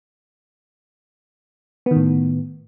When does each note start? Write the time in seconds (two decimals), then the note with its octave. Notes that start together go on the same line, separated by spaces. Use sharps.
1.86 B3
1.91 D#3
1.96 A2